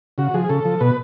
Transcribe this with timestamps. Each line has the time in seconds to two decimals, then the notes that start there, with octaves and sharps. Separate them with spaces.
0.18 C#3 F#4
0.34 F3 G#4
0.49 C#3 A4
0.65 F3
0.81 B2 B4